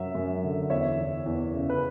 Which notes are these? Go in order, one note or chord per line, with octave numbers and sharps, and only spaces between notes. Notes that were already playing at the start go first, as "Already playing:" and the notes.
Already playing: F#2 F#3 E5
F#2
D3
E2 C#5 E5
E3
E2
C#3
B4